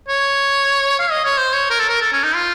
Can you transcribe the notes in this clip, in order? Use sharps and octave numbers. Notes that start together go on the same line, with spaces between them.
C#5
F5
D#5
C#5
C5
C#5
A#4
A4
A#4
A4
C#4
D#4
F4